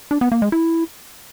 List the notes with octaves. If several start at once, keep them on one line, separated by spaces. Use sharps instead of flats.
D4
B3
A#3
G#3
E4